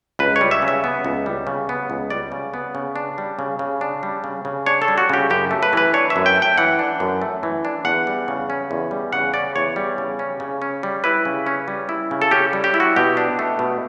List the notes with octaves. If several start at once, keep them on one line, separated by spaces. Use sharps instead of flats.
C#2 B4
C#5
G3
E5
C#3
E5
B3
C#2
G3
C#3
B3
C#2
G3 D5
C#3
B3
C#3
D4
G3
C#3
C#3
D4
G3
C#3
C#3
D4 C#5
A4
G3
F#4
C#3 G4
F#2 G4
A3
B4
E3 B4
D4 C#5
E5
F#2
G5
A3
G5
E3 F#5
D4
F#2
A3
E3
D4
E2 F#5
G3
C#3
C#4
E2
G3
C#3 F#5
C#4 D5
E2 C#5
G3
C#3
C#4
C#3
C#4
G3
E4 B4
C#3
C#4
G3
E4
C#3
A4
C#4 G4
G3
G4
E4
F#4
B2 G4
D4
A3
B2